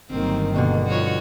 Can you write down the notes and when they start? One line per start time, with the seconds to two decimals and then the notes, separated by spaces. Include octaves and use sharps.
0.10 G1 D#3 F#3 A#3 C4
0.54 G2 B2 D3 A#3
0.88 F3 F#4 C#5